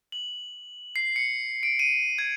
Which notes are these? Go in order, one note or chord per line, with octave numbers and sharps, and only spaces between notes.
F#7
C7
C#7
D7
D#7
G#6